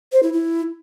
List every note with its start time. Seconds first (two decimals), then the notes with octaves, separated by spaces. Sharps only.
0.13 C5
0.23 E4
0.33 E4